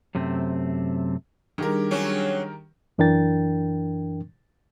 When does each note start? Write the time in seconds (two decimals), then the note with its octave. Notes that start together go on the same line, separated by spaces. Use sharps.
0.15 F#2 C3 A3 C4
1.58 D#3 G3 D4 G4 G#4 A#4
1.91 F#3 C4 C#4
2.98 F#2 E3 D4 A#4 G5 A6